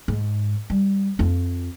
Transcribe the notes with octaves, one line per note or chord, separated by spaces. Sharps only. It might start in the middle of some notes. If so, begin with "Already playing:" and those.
G#2
G3
F2 F4